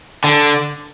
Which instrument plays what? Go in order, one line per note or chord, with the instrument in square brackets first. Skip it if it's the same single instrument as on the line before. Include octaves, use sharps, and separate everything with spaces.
[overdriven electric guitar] D3